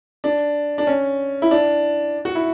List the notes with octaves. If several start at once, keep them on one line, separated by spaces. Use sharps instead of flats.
D4
D4
C#4
E4
D4
F#4
E4